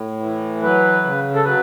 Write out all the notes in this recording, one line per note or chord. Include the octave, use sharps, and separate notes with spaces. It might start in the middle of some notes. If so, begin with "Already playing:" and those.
Already playing: A2
E3
F#3 B4
C#3
A4
F#3 B4